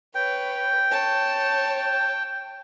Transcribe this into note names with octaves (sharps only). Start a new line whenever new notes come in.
B4 C#5 G5
C#5 A5